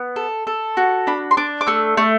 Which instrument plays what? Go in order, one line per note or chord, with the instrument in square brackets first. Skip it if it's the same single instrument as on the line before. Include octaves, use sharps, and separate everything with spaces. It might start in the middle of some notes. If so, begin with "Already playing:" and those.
Already playing: [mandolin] B3
A4
A4
F#4
D4 B5
C6
D4 D6
D6
A3 E6
A3